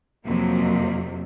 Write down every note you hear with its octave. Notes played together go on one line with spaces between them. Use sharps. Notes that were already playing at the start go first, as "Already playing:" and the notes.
F2 C3 F#3 A#3